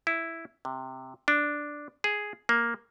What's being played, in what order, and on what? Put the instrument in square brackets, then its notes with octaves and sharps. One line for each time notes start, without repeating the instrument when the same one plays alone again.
[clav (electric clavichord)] E4
C3
D4
G#4
A#3